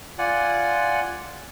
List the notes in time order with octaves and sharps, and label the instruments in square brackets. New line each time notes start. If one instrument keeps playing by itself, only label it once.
[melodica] F4 D5 F#5 G#5